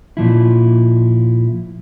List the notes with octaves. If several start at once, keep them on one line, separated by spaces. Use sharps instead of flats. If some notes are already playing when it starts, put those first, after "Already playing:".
A#2 F3 E4